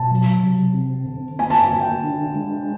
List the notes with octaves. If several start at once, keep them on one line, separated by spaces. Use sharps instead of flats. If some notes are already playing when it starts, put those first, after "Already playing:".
Already playing: B2 A5
F#3
C3
C4
D3
A#3 G#5
A5
G#5
D3
G5
D4
G#3